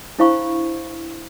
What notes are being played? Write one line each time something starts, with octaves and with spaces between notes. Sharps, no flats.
D4 E4 C5 F5 B5 C#6